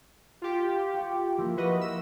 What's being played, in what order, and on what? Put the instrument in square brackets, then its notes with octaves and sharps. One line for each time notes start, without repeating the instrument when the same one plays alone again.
[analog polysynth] F4 G4
[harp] F#4
F3 A#3 E4
[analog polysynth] F#4 B4 D#5 [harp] C#6
[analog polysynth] E6